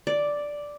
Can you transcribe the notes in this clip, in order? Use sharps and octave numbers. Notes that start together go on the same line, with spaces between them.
D5